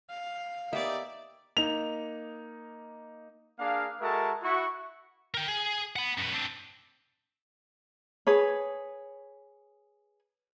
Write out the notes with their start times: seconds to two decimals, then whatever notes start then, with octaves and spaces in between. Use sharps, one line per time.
0.10 F5
0.73 A#3 B3 D#4 G4 D5 E5
1.57 A#3 D#4 F7
3.59 A#3 D4 G#4 F5
4.01 G#3 F#4 A4 A#4 E5 A5
4.43 E4 F#4 C#6
5.34 A#4 G5
5.48 G#4
5.96 F#5 B5
6.18 F#2 B4
6.33 C4 D4
8.27 G#4 B4 C#5